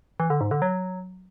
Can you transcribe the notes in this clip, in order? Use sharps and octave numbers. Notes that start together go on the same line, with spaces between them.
E3
D3
G#2
D3
F#3